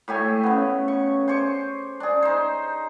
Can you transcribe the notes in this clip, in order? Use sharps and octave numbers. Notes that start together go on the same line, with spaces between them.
A2 A3 G4 G#5
C#3 B3
C#6
C5 G#5 C#6 D6
D4 G#4
D#4 C5